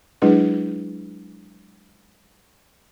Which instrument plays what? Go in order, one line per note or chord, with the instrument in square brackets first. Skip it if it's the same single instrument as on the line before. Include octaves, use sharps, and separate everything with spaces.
[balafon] F#3 G#3 D4 E4 G#4 B4